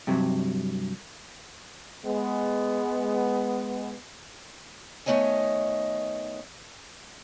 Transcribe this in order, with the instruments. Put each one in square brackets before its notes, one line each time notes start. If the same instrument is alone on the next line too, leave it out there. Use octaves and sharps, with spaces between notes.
[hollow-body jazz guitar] G2 C3 F#3
[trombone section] G#3 B3
[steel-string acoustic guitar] D#3 A3 B3 C#5 D#5 G#5